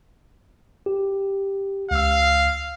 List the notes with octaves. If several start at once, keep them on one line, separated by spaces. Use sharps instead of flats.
G4
C#2 F5 E6